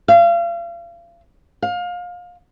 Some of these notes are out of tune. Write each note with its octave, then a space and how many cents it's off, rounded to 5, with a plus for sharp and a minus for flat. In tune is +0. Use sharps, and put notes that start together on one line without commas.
F5 -35
F5 +25